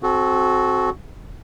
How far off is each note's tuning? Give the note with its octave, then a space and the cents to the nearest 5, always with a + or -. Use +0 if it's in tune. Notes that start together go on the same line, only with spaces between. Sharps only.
C4 +15 F#4 +0 A4 -30